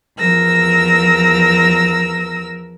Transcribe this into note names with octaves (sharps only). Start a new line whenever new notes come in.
E2 F3 A#4 E6 A#6